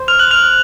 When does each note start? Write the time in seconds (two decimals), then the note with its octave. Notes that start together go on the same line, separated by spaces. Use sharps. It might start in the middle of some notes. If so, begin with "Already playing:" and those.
Already playing: C5
0.08 F6 F7
0.19 F#6 F#7
0.31 F6 F7